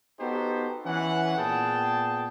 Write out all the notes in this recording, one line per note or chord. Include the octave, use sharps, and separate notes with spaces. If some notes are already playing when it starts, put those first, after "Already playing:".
B3 D#4 F#4 G4 A4 C5
E3 C#4 F#5
A#2 B3 G#4 G5 A5